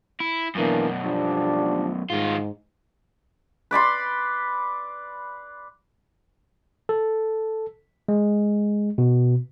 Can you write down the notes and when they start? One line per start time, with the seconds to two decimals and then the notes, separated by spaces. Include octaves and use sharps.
0.20 E4
0.55 F#2 B2 E3 A#3 D4
1.03 F3 G3 D4
2.10 G#2 D#3 F4
3.71 B4 D5 B5 C6
6.89 A4
8.08 G#3
8.98 B2